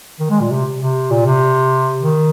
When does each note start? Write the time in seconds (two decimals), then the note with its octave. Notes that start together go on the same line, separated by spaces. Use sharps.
0.20 D#3
0.30 G#3
0.40 A#2
0.50 C3
0.81 C3
1.10 A#2
1.25 C3
2.01 D#3